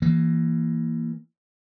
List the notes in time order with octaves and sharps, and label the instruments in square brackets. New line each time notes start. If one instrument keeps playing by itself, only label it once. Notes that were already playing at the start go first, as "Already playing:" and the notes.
[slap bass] E3 A#3